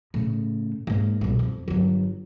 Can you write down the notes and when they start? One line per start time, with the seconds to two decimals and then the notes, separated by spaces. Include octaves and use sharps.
0.14 A2 C#3
0.87 G#2 A#3
1.21 C2 B2
1.39 F2
1.68 G1 F#3